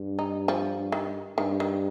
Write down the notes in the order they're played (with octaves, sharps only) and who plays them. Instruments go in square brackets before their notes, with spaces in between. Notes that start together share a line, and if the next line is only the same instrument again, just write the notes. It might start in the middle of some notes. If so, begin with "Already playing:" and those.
Already playing: [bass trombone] G2
[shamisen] D#4
F3
D#3
[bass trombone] G2 [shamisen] D#3
[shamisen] D#3